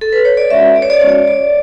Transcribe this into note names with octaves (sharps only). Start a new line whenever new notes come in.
A4
B4
C#5
D5
G#3 C#4 F#4 E5
D5
C#5
D5
G#3 C#4 F#4 C#5
D5